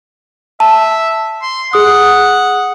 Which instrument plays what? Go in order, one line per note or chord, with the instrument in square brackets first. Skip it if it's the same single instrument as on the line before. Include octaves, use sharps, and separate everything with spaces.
[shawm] E5 [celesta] A5
[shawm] C6
[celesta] G#4 D#6 [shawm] F#5